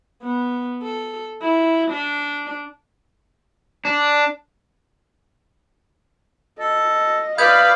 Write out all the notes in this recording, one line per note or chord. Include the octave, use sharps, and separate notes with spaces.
B3
A4
E4
D4
D4
A4 D#5
B4 D5 F5 B5 D#6 G6 G#6